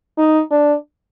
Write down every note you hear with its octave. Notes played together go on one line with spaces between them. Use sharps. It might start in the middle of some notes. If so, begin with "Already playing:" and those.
D#4
D4